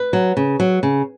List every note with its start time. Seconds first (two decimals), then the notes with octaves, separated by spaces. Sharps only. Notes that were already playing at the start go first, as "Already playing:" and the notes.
Already playing: B4
0.13 F#3
0.37 C#3
0.60 F#3
0.83 C#3